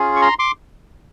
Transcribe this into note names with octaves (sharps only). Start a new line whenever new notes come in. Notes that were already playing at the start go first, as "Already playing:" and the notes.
Already playing: C#4 F4 G#4
C#6
A#5 C6
C6 D6